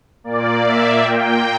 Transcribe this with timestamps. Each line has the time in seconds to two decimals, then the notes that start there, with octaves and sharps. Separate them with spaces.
0.24 A#2 A#3 D5
0.64 E5
1.03 A#2 A#3 G5